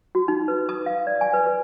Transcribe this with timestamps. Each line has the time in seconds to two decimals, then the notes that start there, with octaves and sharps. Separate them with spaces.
0.15 F#4
0.28 D#4
0.48 B4
0.69 D#6
0.86 F5
1.07 D5
1.21 G#5
1.33 B4
1.46 B4